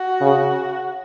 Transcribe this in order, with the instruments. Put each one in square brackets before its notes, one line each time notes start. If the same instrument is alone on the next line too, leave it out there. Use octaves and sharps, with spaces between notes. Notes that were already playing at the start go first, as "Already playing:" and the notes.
Already playing: [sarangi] F#4
[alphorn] C#3